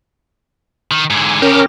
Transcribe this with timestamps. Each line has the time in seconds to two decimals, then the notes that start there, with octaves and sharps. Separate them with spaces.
0.91 D#3
1.10 G#2 D3 G#5
1.42 C#3 C#4 G4 A#4